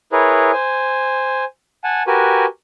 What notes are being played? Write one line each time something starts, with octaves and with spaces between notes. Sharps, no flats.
E4 G#4 A#4 B4 C#5
C5 G#5
F#5 G#5 A5
F#4 G4 A#4 B4 G#5